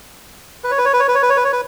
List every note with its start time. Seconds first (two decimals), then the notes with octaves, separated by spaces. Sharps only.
0.64 B4
0.71 C#5
0.78 B4
0.85 C#5
0.93 B4
1.00 C#5
1.08 B4
1.15 C#5
1.22 B4
1.30 C#5
1.37 B4
1.44 C#5
1.52 B4